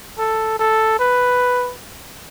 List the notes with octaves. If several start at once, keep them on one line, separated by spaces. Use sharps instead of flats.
A4
A4
B4